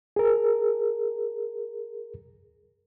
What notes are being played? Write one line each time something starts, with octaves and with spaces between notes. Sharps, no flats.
G#4 A#4